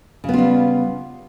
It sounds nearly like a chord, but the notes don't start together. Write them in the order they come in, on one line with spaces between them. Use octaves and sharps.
C#3 B3 F4 G3